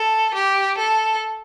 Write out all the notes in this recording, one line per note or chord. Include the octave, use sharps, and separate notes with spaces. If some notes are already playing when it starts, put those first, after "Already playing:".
Already playing: A4
G4
A4